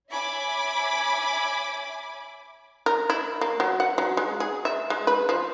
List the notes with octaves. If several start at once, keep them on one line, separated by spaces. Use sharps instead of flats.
C#5 E5 G#5 B5 D6
A#4
E4
A#3
F#3
F#5
F#3
G#3
G#4
E5
G#3
B4
F3